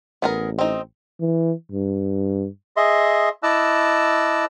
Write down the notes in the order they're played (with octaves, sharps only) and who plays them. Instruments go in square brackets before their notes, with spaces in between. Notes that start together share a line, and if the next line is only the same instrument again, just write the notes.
[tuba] A1 [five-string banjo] B3 G#4 A#4
[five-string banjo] C4 D#4
[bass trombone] E3
G2
[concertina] G#4 D#5 E5 C6
E4 D#5 A5 D6 E6 F#6